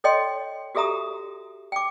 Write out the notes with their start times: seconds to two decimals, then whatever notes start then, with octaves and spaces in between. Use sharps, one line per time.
0.04 A4 C#5 D#5 G5 C6
0.75 F#4 G4 A4 E5 A#5 D#6
1.72 G5 D6